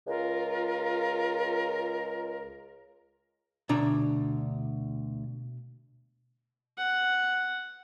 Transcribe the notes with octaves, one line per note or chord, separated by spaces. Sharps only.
C#2 F4 A#4
D2 B2 D4 A#5
F#5